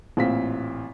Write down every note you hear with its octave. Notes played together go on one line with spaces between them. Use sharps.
A1 A#2 C4 F4 B6